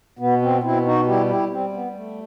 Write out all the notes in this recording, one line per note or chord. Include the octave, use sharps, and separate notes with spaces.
B2 B3
C4
B2 C4 E4
D#4 F#4
G3 E4 G4
E4 G4
G3 C4
B3
A3